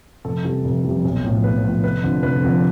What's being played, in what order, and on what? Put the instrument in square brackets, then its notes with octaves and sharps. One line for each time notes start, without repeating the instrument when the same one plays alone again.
[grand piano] F1 A4
F2 C3 E3 G3 A4
F1
F2 C3 E3 G3
B1
A2 F3
B1 B4
A2 F3
F1 B4
F2 D3 F3
F1 B4
F2 D3 F3